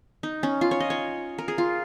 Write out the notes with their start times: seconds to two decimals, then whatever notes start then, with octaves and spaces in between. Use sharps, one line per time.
0.23 D#4
0.43 C#4
0.61 F4
0.71 C#5
0.80 D#5
0.90 C#5
1.38 A#4
1.48 G#4
1.58 F4